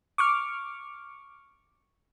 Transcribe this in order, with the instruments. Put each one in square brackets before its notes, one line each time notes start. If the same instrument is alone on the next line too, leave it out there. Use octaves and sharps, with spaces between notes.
[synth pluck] C#6 D6 F6